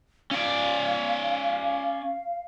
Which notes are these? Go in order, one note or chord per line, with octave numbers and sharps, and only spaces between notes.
C#4 D5 F5